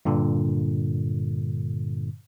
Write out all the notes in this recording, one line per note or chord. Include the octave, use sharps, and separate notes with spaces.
G2 A#2 D3